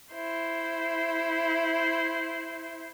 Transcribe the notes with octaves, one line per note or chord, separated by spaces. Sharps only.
E4 C5